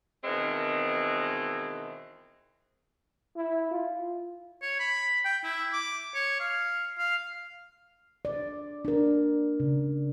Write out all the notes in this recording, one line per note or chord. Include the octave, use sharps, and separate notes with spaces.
B2 D#3 E3 G#3 C4
E4
F4
C#5
B5
G5
E4
D6
C#5
F5
F5
D5
D4 A#4
C#3